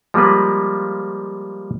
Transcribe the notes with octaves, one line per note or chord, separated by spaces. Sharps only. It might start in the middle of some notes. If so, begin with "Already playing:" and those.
F3 G3 G#3 A#3 B4